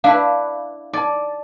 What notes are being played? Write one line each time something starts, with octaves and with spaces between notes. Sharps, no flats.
D4 E4 B4 F5
D#4 D5 A5